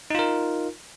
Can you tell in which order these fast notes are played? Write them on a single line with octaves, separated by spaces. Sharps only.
D#4 F4 A#4